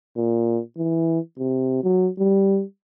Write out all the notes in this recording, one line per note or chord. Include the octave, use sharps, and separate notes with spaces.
A#2
E3
C3
F#3
G3